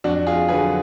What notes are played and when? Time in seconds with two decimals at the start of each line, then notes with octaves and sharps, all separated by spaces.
0.04 F2 D4 F#4
0.27 F4 G#4
0.49 D3 F#3 G#4 B4